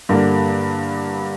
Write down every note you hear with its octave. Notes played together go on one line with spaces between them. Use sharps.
G2 D3 G3 A#3 D4 A#4